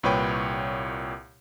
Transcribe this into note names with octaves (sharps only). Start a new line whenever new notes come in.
C2 A#2 B4 C#5 G5